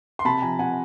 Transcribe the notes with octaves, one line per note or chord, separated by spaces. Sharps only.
C6
C3 A5 B5
F3 G#5 A#5
C3 F#5 G#5